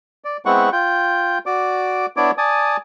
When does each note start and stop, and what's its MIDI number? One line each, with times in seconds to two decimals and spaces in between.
0.24 0.37 74
0.46 0.70 56
0.46 0.70 59
0.46 0.70 60
0.46 0.70 64
0.46 0.70 78
0.46 0.70 85
0.72 1.38 65
0.72 1.38 79
1.46 2.06 66
1.46 2.06 74
1.46 2.06 86
2.17 2.31 59
2.17 2.31 62
2.17 2.31 64
2.17 2.31 73
2.17 2.31 74
2.17 2.31 86
2.38 2.77 74
2.38 2.77 80
2.38 2.77 81
2.38 2.77 87